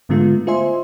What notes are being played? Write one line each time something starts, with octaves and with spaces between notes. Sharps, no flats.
G#2 D3 G#3 A3 B3 F4
F4 C5 D#5 E5 G#5 C6